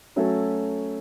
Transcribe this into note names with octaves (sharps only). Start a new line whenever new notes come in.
F#3 A3 C#4 F#4 A4